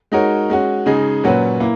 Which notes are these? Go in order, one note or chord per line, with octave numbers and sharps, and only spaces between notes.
G#3 D#4 F#4 A#4 C#5
G#3 C#4 F#4
C#3 G#3 D#4 G#4
A#2 F#3 C#4 F#4 B4
A#3 E4